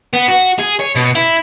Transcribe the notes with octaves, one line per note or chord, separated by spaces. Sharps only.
B3
F#4
G#4
C#5
B2
E4